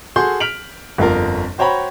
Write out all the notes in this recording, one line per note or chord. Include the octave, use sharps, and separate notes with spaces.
F#4 G#4 A4 C6 G6
F6 B6 D7 F7 F#7
G1 F2 F4 A#4
F#4 C5 C#5 G5 A#5 B5